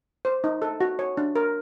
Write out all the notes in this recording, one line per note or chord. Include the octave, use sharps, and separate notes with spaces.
C5
D#4
A4
F#4
C#5
D4
A#4